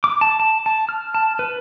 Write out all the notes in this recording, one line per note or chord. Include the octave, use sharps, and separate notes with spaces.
D6
A5
A5
A5
F6
A5
B4